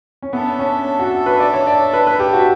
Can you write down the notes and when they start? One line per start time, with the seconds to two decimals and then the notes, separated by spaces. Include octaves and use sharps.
0.22 C#4
0.33 B3 D4 A4 E5
0.59 C#4
0.99 F#4
1.26 B4
1.40 D5
1.54 C#5
1.67 D5
1.93 B4
2.07 B4
2.20 G4
2.33 F#4